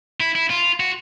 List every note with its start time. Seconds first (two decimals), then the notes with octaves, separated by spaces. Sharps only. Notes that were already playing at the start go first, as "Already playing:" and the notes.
0.20 E4
0.35 E4
0.50 F4
0.80 F#4